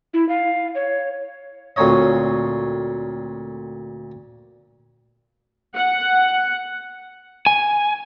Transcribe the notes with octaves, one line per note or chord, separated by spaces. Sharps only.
E4
F5
C#5
D2 A#2 C4 D#4 C#5 D#5
F#5
G#5